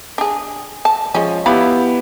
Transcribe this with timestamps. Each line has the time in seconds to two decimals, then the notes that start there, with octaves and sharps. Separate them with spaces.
0.18 D4 G#4
0.85 A5
1.14 F3 G#3 C#4
1.46 B3 E4 G4 F5 B5